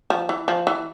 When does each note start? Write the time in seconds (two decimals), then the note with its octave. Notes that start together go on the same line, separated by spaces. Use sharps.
0.10 F3
0.29 E3
0.48 F3
0.67 E3